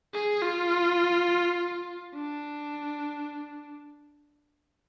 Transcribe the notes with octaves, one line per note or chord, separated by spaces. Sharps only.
G#4
F4
D4